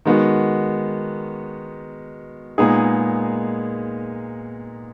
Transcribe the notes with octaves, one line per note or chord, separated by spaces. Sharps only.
D#3 G#3 B3 F#4
A#2 G#3 B3 D#4 G#4